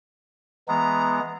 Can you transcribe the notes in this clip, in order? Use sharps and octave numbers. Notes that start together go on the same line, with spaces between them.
E3 G#3 B3 A#5